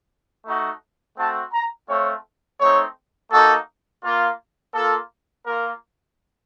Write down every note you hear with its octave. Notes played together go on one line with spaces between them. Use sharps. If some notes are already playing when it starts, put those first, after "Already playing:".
A3 D#4 F#4
A3 C4 F#4 A5
A#5
A3 C4 F4 C#5
A3 C4 D#4 C#5
A#3 D#4 F#4 A4
A#3 F4
A#3 F4 A4
A#3 F4 A#4